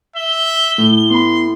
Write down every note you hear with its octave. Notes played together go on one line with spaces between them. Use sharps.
E5 G7
A2 A3
B3 B5 C6